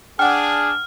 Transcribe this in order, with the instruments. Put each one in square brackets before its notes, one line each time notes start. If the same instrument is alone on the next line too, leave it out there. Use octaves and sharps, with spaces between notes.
[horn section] D4 [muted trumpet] G#4 [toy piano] F#5 G5 [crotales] F6